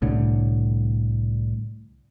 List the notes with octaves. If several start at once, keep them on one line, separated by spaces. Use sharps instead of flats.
C2 A2 D3